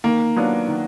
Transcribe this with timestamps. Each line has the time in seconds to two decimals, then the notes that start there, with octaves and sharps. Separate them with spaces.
0.04 D#3 A#3
0.36 F#3 B3 D4 F4
0.68 D#3